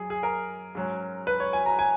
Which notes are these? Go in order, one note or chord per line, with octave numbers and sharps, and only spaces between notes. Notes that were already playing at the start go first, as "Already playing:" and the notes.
Already playing: F#2 G#4
G#4
A#4
G#2 F#3 C#4
B4
C#5
G#5
A#5
G#5